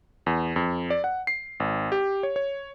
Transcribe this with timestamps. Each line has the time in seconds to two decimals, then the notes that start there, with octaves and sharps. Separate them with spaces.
0.26 E2
0.56 F2
0.90 D5
1.04 F#5
1.27 C7
1.60 G#1
1.92 G4
2.23 C#5
2.36 C#5